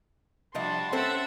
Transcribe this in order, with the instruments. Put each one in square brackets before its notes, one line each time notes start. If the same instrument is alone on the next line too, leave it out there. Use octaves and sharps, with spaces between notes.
[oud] C3 F3 D#5 [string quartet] G3 D4 F#4 [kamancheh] A5 C6
[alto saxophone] C4 [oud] C#4 A4 C5 [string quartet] E5 F#5 E6